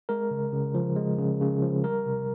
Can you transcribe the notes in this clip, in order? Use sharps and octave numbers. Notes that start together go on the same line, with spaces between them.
G#3 A#4
C#3
C#3
F3
G#3
C#3
C#3
F3
G3 A#4
C3